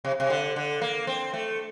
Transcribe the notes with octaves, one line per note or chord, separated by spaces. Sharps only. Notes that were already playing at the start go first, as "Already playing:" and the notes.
C3
C3
D3
D3
A#3
C4
A3